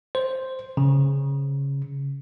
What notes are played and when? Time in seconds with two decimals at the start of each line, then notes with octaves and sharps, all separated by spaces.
0.15 C5
0.77 C#3